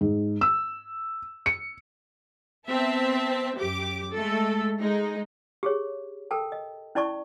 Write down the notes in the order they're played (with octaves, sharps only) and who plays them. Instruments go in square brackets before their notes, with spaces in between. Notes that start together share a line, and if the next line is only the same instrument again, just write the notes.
[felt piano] G#2
E6
C#7
[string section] B3 C4 E5 A5
F#2 G4 D6
G#3 A3 A4
G#3 D#4
[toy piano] G4 G#4 C#5
A4 A#4 G5 A5
D#5
C#4 E4 D5 A5 C#6